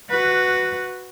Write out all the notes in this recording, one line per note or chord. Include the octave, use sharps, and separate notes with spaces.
F#4 B4